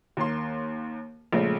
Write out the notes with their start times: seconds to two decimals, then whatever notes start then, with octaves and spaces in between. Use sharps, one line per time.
0.17 D#2 A#3 C6
1.33 A#1 C#3 G#3 A3